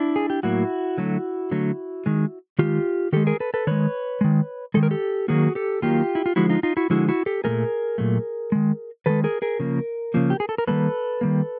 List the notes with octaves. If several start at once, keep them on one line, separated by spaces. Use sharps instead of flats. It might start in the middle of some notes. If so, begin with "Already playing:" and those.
Already playing: D4 E4
G#4
G4
A2 F#3 A#3 E4 F#4
D3 F#3 A3
D3 F#3 A3
D#3 G#3
D#3 G#3 F4 G4
D#3 G#3 G4 A4
G#4 A#4
A4 B4
A4 B4
D#3 G#3 B4 C#5
D#3 G#3
D#3 G#3 A4
A#4
G4 A4
D#3 F#3 A#3 F#4 G#4
G4 A4
D#3 F#3 A#3 F4 G4
E4
F4
D3 F3 G#3 E4 F#4
D#4 F4
D#4 F4
E4 F#4
D3 F3 G#3 E4 F#4
E4 F#4
G4 A4
A#2 F#3 A3 G#4 A#4
A#2 F#3 A3
D#3 G#3
D#3 G#3 A4 B4
G#4 A#4
G#4 A#4
C#3 F3 A#3
C#3 F3 A#3
G4
G#4
A4
A#4
D#3 G3 A#3 A4 B4
D#3 G3 A#3